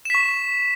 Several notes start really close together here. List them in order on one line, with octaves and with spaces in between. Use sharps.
E7 B6 C#6